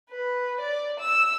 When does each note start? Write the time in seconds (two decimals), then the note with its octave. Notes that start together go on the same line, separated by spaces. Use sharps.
0.10 B4
0.60 D5
1.00 E6